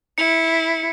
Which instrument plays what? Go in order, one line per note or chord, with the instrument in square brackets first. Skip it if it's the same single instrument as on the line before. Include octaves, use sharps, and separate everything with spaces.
[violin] E4 [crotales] C#7